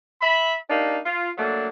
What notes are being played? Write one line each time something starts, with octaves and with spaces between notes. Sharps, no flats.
E5 B5
A#3 D4 D#4 G4
F4
F#3 A3 A#3 D4